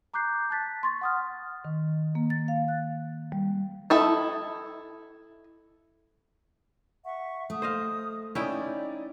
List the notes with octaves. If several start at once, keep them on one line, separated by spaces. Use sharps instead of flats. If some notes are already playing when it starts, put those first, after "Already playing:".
A#5 D6 F#6 G6 C7
A5 F#6 A6 B6
C6 C#6 A6
F#5 D#6 F6
D#3
A#3
A6
F5
F#6
G3
E4 A4 D#5
E5 F#5 C#6
A3 D#6
C5 D#5 F5
C#4 D#4 E4 D5 G5